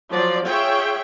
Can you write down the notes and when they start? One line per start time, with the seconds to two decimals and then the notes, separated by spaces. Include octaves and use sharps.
0.11 F3 F#3 D5
0.46 F4 G#4 C#5 E5 G5